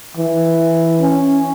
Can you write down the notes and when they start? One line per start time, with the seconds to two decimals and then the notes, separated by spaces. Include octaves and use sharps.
0.17 E3
1.00 C#4